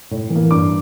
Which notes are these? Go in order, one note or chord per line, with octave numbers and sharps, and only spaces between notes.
A2
E3
A#3
G2 D6